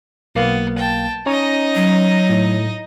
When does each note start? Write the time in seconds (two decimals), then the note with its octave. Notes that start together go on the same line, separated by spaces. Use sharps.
0.35 B1 A#3 B3 F5
0.78 G5 A5
1.26 C#4 D#4 C#5 D#5 A#5
1.75 F#3
2.29 A2